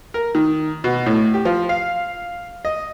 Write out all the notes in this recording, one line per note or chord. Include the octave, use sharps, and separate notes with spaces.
A#4
D#3
B2
A2
G4
F3
F5
D#5